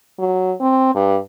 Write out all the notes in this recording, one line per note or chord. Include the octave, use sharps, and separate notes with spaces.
F#3
C4
G2